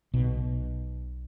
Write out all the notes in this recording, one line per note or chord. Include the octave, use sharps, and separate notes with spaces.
B1 B2